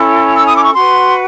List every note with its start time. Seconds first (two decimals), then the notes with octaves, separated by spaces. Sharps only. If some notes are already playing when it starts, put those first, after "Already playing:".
Already playing: C#4 E4 A4
0.35 E6
0.46 D#6
0.54 D6
0.64 C#6
0.74 F#4 B4 C6